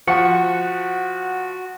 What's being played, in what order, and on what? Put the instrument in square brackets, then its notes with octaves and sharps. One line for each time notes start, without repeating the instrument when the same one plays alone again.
[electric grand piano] F3 [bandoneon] F#4 [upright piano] F#5 [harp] C#6